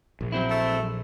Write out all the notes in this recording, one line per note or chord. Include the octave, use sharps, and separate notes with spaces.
A#1
F#3 C4 E4
A3